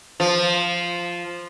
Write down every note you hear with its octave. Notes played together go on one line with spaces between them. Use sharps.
F3